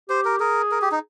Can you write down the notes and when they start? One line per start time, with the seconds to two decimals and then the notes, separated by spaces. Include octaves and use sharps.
0.09 G4 C5
0.25 A#4
0.40 G#4 A#4
0.71 A#4
0.82 G4
0.92 D#4